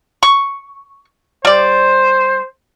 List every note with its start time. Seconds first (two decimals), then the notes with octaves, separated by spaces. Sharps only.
0.23 C#6
1.45 G3 C5 D5